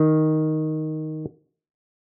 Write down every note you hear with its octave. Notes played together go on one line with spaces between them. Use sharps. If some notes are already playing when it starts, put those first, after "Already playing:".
Already playing: D#3